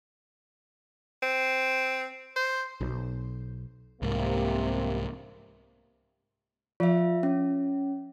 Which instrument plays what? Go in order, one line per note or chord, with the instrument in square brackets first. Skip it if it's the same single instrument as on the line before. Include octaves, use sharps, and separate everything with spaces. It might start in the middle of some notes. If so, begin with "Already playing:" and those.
[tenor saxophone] C4
C5
[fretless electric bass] B1
[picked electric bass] C2 G#2 [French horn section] C3 A#3
[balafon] F3 [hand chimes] F4 E5
[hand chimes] C#4